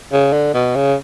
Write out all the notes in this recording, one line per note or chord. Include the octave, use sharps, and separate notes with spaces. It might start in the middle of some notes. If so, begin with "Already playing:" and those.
C#3
D3
B2
C#3